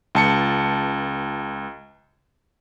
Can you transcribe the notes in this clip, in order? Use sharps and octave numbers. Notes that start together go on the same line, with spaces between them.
C#2 A5 C#7